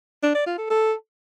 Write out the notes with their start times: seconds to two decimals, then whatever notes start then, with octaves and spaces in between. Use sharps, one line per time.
0.23 D4
0.35 D5
0.46 F4
0.58 A4
0.70 A4